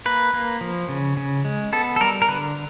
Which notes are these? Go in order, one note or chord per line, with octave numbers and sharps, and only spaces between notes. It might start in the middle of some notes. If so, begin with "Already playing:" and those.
A#3 B4
A#3
F3
C#3
C#3
G#3
B3 A4
A4
G3 A#4
A#4
D3 B4